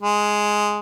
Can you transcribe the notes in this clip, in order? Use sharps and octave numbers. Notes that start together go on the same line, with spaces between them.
G#3